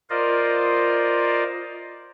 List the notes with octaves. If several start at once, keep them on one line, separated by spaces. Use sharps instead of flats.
F4 A#4 C5 D5 D#5 F5